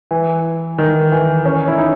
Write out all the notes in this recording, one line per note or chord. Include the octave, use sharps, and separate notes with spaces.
E3
D#3
E3
C#4
E4
D#4